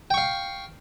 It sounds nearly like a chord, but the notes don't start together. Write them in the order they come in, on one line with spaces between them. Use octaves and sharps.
G5 C#6 F5